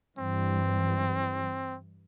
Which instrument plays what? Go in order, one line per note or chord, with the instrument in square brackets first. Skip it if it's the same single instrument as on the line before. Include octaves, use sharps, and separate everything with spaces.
[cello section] G2 E3 G3 [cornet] C4